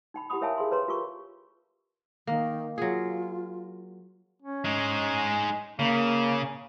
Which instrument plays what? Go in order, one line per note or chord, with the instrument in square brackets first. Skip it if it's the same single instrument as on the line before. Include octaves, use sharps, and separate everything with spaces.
[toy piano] D#4 G5 B5
E4 G4 F#5 G5 B5 D#6
A#4 C#5 E5 F5 G#5 A5
G#4 A#4 F5 B5 C6
B4 C#5 A#5 C6
F4 G4 A#4 C#6
[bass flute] D#3 [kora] A#3
[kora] F#3 G#4 [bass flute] F4
[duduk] C#4
[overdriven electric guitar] G#3 D#4
[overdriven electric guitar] C#3 [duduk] A#3